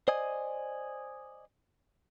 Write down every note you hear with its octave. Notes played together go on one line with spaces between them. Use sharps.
C5 D5 D#5 G#5